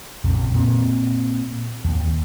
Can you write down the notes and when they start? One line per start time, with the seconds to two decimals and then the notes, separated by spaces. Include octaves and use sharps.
0.24 A#1 F2 C#3
0.54 A#2 C4
1.84 D#2